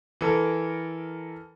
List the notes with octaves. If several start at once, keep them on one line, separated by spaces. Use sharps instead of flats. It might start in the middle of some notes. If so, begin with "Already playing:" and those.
E3 A4 A#4